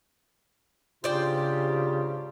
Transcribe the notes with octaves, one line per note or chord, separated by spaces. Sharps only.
G#2 C#3 D4 F4 G4 C5 D5 G5